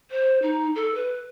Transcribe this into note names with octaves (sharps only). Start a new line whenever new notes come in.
C5
D#4
A4
B4